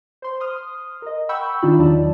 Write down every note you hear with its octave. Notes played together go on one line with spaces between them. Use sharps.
C5 C6
C6 D#6 F6
A#4 D#5
F#5 G5 B5 C#6 E6 G6
D#3 D4 D#4 F4 B5
E2 D#3 F#3 D#4 D5 A5